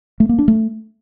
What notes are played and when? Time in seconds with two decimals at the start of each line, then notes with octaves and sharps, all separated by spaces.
0.20 A3
0.29 A#3
0.39 D4
0.48 A3